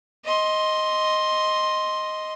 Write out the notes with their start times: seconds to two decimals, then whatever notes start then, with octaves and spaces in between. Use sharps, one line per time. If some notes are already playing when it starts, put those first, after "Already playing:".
0.25 D#5 C6